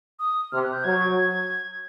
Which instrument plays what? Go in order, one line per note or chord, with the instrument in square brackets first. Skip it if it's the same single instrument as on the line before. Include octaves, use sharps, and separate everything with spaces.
[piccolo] D#6
[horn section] C3 [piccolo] F6
[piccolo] F#6
G6
[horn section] F#3 [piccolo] G#6
[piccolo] G#6